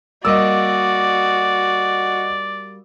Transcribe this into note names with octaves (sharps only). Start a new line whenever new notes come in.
G3 A#3 F#4 D5 D#5 D6 E6